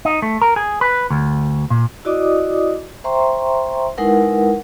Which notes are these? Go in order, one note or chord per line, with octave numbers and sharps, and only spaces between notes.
D#4
A3
A#4
G#4
B4
D2
A#2
E4 F#4 D5 D#5 D6 D#6
C5 E5 G5 A#5 C6 C#6
G#3 D#4 E4 A#4 B4 F#5